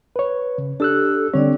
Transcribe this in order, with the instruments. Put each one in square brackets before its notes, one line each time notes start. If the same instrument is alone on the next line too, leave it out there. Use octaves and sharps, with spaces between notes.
[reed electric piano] B4 C#5
C#3
[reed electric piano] D4 E6 F#6 [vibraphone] G4 [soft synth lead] A4
[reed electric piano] D3 C#5 [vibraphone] G3 D4 D5 [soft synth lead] C4